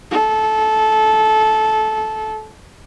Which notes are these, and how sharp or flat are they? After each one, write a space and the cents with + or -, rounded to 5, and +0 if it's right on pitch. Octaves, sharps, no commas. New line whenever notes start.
A4 -20